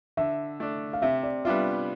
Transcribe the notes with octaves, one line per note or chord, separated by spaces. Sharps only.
D3 E5
A3 D4
F5
C3 E5
D5
G3 B3 D4 F4 E5